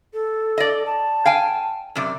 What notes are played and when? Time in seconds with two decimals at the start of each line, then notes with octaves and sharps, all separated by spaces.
0.14 A4
0.58 D5 D#5
0.86 A5
1.25 F5 G5 G#5
1.96 F#2 C3 D5